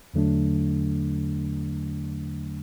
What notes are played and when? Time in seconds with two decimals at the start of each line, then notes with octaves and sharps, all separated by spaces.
0.14 E2 D3 F#3 A3 D4